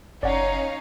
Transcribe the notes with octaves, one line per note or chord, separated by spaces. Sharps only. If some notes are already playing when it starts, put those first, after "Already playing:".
F#1 C#4 D#4 C#5 D5 F5 F#5